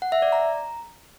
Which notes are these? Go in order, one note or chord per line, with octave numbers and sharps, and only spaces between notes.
F#5
E5
D5
A#5